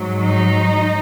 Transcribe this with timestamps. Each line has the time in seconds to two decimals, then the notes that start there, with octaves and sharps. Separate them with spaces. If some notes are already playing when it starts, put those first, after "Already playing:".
Already playing: G#2 F#3
0.23 D#4